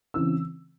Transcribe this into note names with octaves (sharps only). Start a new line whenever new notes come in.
C#3 E3 C4 E6